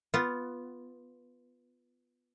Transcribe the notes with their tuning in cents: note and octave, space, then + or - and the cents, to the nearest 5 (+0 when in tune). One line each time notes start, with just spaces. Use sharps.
B3 +0 F4 +0